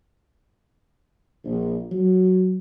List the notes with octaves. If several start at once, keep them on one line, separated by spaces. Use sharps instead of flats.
A#1
F#3